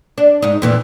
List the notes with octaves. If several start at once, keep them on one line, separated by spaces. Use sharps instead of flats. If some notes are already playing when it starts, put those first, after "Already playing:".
D4
G#2 D#4
F2 A#2 E3